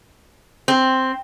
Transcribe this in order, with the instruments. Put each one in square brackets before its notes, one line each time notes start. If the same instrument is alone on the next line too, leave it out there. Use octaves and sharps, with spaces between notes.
[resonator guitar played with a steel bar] C4